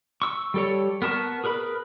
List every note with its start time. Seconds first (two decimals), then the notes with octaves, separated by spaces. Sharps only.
0.22 C#6 E6
0.54 G3 A4 C#5
1.02 B3 A#4 A5 C#6
1.44 G#4 A#4 B4 B5